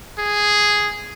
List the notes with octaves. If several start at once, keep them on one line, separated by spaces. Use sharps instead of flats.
G#4